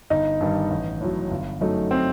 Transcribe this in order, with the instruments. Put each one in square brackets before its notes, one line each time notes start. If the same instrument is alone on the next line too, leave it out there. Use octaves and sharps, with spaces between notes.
[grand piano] G1 [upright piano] D#4
[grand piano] G2 D#3 G3
A1
A2 F#3
G1
F#2 F#3 A3 D#4
[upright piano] C4